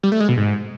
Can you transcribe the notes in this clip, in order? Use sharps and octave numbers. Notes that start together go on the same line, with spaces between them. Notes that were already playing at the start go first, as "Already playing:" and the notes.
G3
A3
G#3
B2
G#2